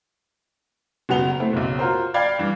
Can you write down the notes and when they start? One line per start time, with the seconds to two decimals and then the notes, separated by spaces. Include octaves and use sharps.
1.09 F#1 F#3 B3 F7 G7
1.40 A3 C4 E4
1.53 F#1 B1
1.79 F4 F#4 A#4 C5
2.14 D5 F5 G5 B5 G#6
2.39 G2 E3